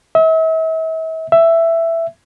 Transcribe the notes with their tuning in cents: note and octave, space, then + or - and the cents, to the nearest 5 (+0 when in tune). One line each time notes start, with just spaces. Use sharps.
E5 -40
E5 +10